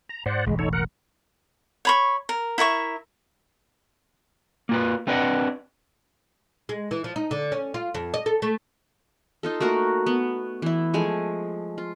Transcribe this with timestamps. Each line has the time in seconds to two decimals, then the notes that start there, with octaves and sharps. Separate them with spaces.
0.09 A#5
0.26 G#2 C5 D5 F#5
0.47 E1 A1 G#3
0.59 D#4 A4 C#5
0.73 A#4 F#5
1.85 C#5 B5 C#6
2.29 A#4
2.58 E4 A#4 E5 C#6
4.69 A#3 F4 B4
5.07 A3 C4 D4 B4 D#5 F#5
6.69 G#3
6.91 E3
7.04 F3
7.16 D#4
7.31 D3
7.52 C#4
7.74 F4
7.95 F2
8.14 D#5
8.26 A4
8.42 A3
9.43 D#4 F4 A4
9.60 A3 A#3 F#4 A#4
10.06 B3
10.62 E3 E4
10.94 F3 G#3 A3 G#5
11.78 F4